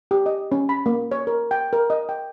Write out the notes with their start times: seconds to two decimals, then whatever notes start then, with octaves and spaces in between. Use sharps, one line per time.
0.11 G4
0.26 D#5
0.52 C#4
0.69 B5
0.86 A#3
1.11 C#5
1.27 A#4
1.51 G5
1.73 A#4
1.90 D#5
2.09 G5